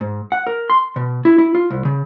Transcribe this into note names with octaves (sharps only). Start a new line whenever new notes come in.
G#2
F#5
A#4
C6
B2
E4
E4
F4
C2
C#3